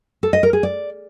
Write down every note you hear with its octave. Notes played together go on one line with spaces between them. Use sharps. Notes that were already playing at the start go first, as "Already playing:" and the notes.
A4
D#5
A#4
G#4
D5